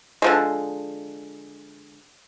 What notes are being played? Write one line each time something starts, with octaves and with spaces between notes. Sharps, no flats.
D3 F3 G#3